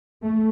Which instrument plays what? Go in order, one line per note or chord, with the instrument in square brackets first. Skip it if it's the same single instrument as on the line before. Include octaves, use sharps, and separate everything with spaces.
[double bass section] A3